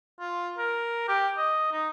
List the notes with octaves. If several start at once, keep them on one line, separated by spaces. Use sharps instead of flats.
F4
A#4
G4
D#5
D#4